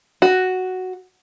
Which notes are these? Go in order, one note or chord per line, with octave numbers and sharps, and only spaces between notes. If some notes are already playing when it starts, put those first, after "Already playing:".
F#4